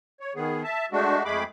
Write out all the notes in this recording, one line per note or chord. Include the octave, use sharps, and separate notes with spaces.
C#5
D#3 B3 G#4
E5 A5
G#3 A3 D4 F#4
F2 G#3 A3 G#4 B5 D6